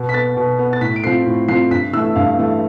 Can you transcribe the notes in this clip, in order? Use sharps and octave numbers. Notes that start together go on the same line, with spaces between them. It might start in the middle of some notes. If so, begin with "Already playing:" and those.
Already playing: B2
B6
B3 A6
B2
B3
A6
A2 B6
D7
F3 C4 C7
A2
F3 C4 C7
G2 B6
E3 A3 E6
G2 F5
E3 A3